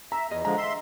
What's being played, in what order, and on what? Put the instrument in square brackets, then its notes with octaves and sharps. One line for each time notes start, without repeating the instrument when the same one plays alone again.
[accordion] E5 [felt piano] A#5
[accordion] E2 [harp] F4 G#4 D#5
[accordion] D3 F3 G#3 [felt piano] A#5
[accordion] E5 C6